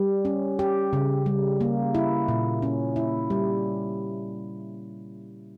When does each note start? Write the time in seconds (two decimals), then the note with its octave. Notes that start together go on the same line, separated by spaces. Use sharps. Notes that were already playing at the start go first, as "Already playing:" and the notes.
Already playing: G3
0.25 C#4
0.59 G4
0.93 C#3
1.26 G3
1.61 A#3
1.95 E4
2.28 A#2
2.62 C#4
2.96 E4
3.30 G3